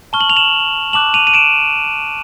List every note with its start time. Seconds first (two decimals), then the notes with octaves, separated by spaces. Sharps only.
0.13 A5 C#6 F6 G7
0.21 F#7
0.30 F7
0.36 E7 F#7
0.93 A5 D6 F#6 E7 F#7
1.14 D#7 F7
1.27 D#7
1.34 D7 E7